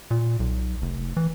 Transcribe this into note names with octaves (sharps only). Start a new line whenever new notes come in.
A#2
B1
F1
E3